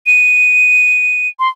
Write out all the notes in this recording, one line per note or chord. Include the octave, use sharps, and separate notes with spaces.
D#7
C6